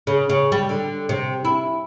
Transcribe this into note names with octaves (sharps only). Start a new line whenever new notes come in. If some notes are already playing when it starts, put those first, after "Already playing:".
C#3
C#3
G3
D3
C3
E4